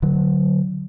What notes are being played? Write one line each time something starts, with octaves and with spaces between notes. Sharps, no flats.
D3 F#3